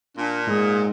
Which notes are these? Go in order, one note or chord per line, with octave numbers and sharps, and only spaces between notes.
A#2 D4
G#2 G#4